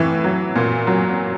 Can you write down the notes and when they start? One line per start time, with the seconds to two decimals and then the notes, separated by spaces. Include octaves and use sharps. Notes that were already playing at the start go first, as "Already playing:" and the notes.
Already playing: A2 E3
0.24 F#3
0.56 A#2
0.87 F#3